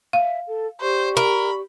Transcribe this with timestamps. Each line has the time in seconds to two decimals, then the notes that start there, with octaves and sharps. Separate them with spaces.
0.13 E5 F5
0.47 A4
0.81 G4 C5 D5 C#6
1.17 A#4 B5